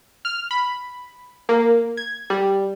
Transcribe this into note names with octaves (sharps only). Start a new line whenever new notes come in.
F6
B5
A#3
G#6
G3